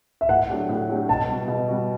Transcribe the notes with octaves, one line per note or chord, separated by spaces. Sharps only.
E5
A2 F#5
F#3 A3 D4 G4
A2
F#3 A3 D4 G4
B2 A5
G3 B3 F#4
B2
G3 B3 F#4